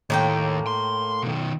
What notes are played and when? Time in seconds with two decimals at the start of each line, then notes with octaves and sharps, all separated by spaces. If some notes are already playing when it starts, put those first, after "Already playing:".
0.10 D#2 A2 A#3 G5
0.66 C6
1.23 B2 D#3